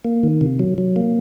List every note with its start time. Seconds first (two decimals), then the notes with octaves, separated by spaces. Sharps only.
0.05 A#3
0.23 D#3
0.41 C3
0.59 F#3
0.78 F#3
0.96 A#3